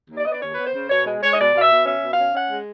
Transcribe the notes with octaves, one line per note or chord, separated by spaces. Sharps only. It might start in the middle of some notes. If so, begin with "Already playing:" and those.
D#2
D5
B3 D#5
D5
D#2 C#5
B3 B4
C5
C#3
B2 C#5
G#3
G#3 C#5
D#5
B2 D5
B2 F5
E5
B2
C#4 E5
B2
F5
C#4
C#4 F#5
G#3